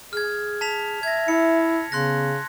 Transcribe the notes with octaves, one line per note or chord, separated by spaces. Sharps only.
G#4 F6 G#6
A5 B6 F7
E5 G#6 A#6
E4 C#7
C#3 B3 C6 F#6 A#6